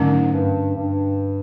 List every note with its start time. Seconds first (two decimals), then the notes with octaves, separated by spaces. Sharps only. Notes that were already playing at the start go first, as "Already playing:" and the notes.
Already playing: G#2 D3 F#3 A3 C#4
0.32 G2
0.76 G2